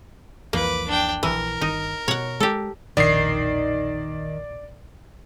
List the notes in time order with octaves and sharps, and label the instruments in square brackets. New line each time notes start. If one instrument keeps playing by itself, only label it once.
[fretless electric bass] C2 F2 E3 [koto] A#3 [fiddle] B4 D6
[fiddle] D4 G5
[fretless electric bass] D1 A#1 [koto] E3 [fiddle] A#4
[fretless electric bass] G1 D#3 [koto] D#4
[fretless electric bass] B2 [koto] C#5 F#5
[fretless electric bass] G#3 [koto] G4 A4
[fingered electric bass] E1 A#1 D4 [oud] D#3 [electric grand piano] D5 C7